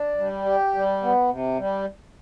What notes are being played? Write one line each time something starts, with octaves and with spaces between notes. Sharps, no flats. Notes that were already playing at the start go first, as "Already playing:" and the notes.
Already playing: D4
G3
G4
G3
B3
C3
G3